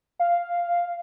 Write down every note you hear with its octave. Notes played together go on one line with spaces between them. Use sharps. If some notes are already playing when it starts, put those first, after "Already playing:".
F5